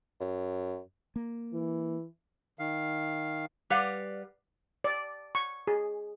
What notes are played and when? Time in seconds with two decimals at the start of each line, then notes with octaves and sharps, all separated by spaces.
0.20 F#2
1.16 A#3
1.54 E3
2.59 D#3 F5
3.70 G3 G4 B4 D5 F5 F#5
4.84 D5
5.35 C#6
5.67 G#4